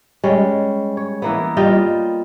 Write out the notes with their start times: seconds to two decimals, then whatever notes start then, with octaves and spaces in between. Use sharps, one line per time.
0.24 G3 G#3 C#4
0.97 C#5
1.22 E3 A#3 B3
1.57 G3 F4 D#5 G5